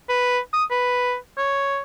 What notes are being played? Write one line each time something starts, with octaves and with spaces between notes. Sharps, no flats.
B4
D#6
B4
C#5